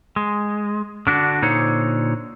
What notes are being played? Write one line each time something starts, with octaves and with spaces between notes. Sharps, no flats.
G#3
D3 D4 F#4
A#2 D3 D#4 C5 C#5